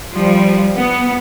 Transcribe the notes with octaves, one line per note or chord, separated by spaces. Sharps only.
F3 G3
B3